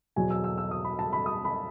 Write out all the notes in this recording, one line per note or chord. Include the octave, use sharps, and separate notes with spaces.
E2 B2 F#3 G#5
E6
E6
E6
D#6
B5
A5
B5
D#6
B5